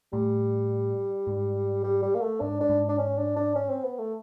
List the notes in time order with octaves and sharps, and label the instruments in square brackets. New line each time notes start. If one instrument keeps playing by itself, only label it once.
[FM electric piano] A2 [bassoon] G3
[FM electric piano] G#2
[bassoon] G3
G3
A#3
A3
[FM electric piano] G#2 [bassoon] D4
[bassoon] D4
[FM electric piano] G#2
[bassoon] D4
C#4
D4
D4
C#4
C4
B3
A3